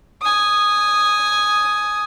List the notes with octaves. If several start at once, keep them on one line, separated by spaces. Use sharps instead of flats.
G#5 D#6